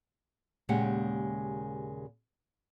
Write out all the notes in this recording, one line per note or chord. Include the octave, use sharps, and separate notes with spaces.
D#2 A#2 C#3 G#3 G4 F#5